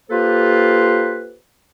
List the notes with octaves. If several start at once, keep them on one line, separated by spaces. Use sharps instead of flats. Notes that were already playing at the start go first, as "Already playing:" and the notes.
A#3 F4 G4 A4 B4 C5